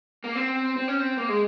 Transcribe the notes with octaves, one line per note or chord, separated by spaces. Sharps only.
A#3
C4
C4
C#4
C4
A#3
G#3